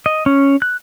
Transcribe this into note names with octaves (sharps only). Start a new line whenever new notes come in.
D#5
C#4
F#6